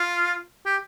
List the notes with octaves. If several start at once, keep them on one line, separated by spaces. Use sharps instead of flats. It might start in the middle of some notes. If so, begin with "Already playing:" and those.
Already playing: F4
G4